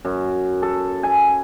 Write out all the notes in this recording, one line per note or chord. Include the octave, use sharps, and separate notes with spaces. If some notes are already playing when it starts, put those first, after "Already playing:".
F#2
A4
G#5